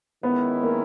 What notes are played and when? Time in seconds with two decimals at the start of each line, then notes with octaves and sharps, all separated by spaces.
0.23 D#3 G#3 B3 C#4 E4
0.63 A#3